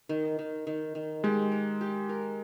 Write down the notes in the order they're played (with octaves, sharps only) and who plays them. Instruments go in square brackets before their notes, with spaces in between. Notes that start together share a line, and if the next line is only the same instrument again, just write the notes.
[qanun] D#3
D#3
D#3
D#3
[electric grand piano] G#3 [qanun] G4
[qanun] A#4
G4
A#4